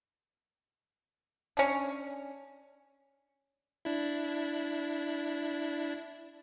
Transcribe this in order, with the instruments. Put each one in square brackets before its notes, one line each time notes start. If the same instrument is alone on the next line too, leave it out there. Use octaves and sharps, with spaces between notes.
[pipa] C#4 D4
[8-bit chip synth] D4 E4